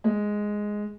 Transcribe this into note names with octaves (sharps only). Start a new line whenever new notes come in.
G#3